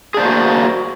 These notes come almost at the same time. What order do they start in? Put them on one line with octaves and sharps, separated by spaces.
G#4 D4 C5 A#3 F#4